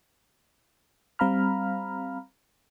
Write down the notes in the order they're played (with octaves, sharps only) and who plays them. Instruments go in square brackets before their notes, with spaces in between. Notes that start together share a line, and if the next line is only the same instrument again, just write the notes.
[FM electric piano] G3 C4 F5 A#5 B5 F6